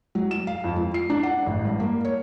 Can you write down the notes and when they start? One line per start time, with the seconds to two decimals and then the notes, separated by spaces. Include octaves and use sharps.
0.15 F#3
0.31 E7
0.47 F5
0.64 F2
0.76 F3
0.94 C7
1.10 D4
1.23 F#5
1.46 A1
1.65 G2
1.80 A#3
2.05 C#5